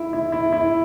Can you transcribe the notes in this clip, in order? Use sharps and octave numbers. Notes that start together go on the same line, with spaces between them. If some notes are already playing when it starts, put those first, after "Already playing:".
Already playing: E4
E4
E4
E4